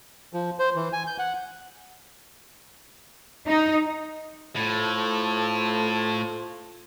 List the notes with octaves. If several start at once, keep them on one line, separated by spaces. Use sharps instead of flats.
F3
C5
E3
G#5
G6
F#5
D#4
A2 F4 A4 C5